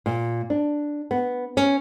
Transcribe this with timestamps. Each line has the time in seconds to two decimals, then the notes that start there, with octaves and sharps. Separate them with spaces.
0.06 A#2
0.50 D4
1.11 B3
1.57 C#4